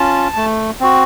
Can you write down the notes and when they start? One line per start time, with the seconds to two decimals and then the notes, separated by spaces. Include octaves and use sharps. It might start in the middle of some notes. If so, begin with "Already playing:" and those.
Already playing: C#4 F4 A5
0.36 A3
0.80 C4 F#4